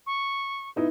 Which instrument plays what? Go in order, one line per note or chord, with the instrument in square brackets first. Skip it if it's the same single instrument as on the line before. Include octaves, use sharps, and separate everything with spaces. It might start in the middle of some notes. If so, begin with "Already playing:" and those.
[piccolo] C#6
[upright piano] B3 D#4 E4